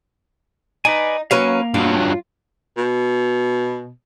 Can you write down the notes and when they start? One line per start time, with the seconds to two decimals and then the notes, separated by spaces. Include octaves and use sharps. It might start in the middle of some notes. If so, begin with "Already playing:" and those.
0.85 D#4 B4 D5 G#5
1.31 F#3 A#3 C#4 B4 F5
1.74 G2 F#3 F4
2.77 B2